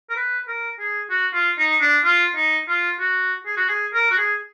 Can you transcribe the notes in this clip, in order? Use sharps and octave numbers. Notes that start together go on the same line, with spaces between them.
A#4
B4
A#4
G#4
F#4
F4
D#4
D4
F4
D#4
F4
F#4
G#4
F#4
G#4
A#4
F#4
G#4